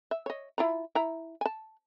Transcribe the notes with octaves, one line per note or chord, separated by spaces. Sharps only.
E5
C#5 D#5
E4 F4 A#5
E4 A#5
G#5 A5